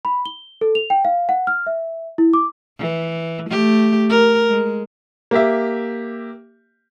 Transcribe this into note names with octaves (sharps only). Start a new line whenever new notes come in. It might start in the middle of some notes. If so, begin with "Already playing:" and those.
B5
G7
A4
F7
G5
F5
F#5
F6
E5
E4
D6
E3
A3 G4
A#4
G#3
A#3 G4 E5